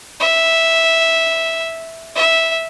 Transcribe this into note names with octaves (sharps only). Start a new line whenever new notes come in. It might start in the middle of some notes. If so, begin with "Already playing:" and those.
E5
E5